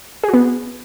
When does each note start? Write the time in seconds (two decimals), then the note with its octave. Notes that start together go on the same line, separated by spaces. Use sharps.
0.24 G#4
0.29 F#4
0.34 B3